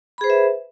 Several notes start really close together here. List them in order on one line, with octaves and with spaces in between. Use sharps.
B5 G#4 C5 B4 E5